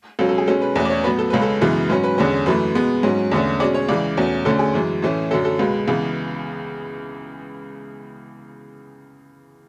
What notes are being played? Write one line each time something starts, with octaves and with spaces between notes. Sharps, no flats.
C#2 B2 F#3 C#4 A4
A4
G#4
B2 G#3 C#4 A4
B4
E2 B2 A3 C#4 B4
D5
C#5
A2 F#3 B3 B4
A4
C#2 C#3 G#3 C#4 B4
A4
F#2 C#3 E3 G#3 B3
G#2 F#3 C#4 B4
B4
E2 D3 G#3 C#4
F#2 E3 A3 B4
B2 G#3 B3
G#2 F#3 C#4
E2 D3 A3 C#4
B2 G#3 C#4 D5
C#5
C#2 C#3 E3 D5
E2 B2 A3 C#4
D2 D3 A3 C#4 A4
G#4
F#2 E3 G#3
A2 E3 A3 C#4
F#2 D3 F#3 C#4 A4
A4
C#2 B2 G#3 B4
C#2 C#3 E3 B3